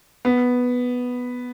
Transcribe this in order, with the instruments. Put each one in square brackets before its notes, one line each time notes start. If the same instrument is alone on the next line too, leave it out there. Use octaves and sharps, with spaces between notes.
[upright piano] B3